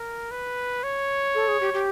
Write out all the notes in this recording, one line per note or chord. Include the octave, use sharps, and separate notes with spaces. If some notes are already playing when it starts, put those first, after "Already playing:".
Already playing: A#4
B4
C#5
A4
G#4
G4
G4